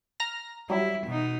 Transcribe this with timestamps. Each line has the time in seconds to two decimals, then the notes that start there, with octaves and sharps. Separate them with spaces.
0.20 A#5 F6 A#6
0.70 F#3 G3 E4
1.07 B2 D#4